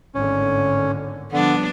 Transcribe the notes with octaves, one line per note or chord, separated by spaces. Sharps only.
G#1 A2 D3 C#4
D3 F3 G3 B3 D4